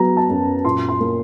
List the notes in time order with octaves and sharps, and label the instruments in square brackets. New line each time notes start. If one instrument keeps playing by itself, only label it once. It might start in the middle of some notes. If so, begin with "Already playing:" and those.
Already playing: [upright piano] F#3 B3 A#5
A5
F#2
A#2 C6
C6
A#3